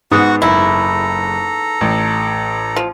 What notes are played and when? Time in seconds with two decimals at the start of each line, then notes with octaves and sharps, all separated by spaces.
0.12 G#2 B3 F#4 F#5 C#6 D#6
0.42 F#1 E4 A4 A#5
1.81 A1
2.76 F3